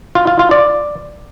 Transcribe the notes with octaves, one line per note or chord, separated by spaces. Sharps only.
F4
F4
F4
D5